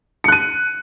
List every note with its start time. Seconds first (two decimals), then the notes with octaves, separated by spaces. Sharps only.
0.24 C#7
0.28 F#6
0.32 D#7